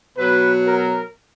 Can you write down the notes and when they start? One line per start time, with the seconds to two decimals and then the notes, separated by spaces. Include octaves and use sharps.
0.17 B2 F#3 B4
0.67 A#4